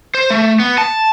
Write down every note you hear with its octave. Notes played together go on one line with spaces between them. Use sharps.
C5
A3
B3
A5